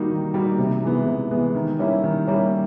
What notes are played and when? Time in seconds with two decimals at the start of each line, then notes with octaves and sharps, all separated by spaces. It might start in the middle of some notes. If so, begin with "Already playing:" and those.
Already playing: D#3 G3 A#3 D#4 F#4
0.10 D#3
0.34 G3 A#3 D#4 F#4
0.59 C3
0.83 E3 G#3 B3
1.06 C3
1.31 E3 G#3 B3
1.55 D#3
1.79 G3 A#3 C#4 E4
2.04 D#3
2.27 G3 A#3 C#4 E4